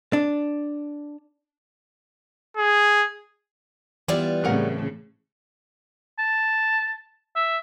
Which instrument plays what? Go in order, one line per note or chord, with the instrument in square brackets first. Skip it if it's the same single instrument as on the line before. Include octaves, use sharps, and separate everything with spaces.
[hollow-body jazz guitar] D4
[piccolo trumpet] G#4
[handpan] E3 [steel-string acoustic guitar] G3 B3 [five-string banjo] E4 F4 D5
[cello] A2 C#3 [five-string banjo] F#3 A#4 F#5 [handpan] C4
[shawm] A5
E5